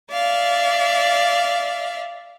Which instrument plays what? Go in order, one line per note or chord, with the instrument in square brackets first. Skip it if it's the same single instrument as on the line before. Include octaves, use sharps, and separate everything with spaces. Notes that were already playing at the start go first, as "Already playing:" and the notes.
[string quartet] D5 E5 F5